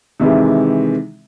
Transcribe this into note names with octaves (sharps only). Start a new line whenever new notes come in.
C3 D#3 E3 G#3